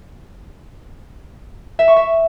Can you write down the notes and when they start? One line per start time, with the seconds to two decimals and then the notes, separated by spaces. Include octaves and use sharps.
1.79 E5
1.88 C#6
1.96 E5